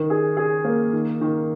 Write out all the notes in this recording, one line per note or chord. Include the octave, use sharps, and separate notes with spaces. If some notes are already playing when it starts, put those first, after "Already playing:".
Already playing: D#3
G#4
G#4
A#3
D#3
D#3